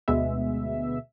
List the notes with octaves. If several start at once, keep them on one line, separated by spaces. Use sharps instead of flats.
D2 B2 G#3 B3 E5